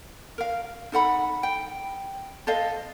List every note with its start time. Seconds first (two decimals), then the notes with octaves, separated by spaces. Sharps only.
0.38 A#4 F5
0.92 D#4 A4 F#5 B5
1.43 G5
2.47 A4 C5 D#5 F5